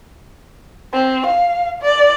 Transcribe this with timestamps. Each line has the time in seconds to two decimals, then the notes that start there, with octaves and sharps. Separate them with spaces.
0.93 C4
1.27 F5
1.82 D5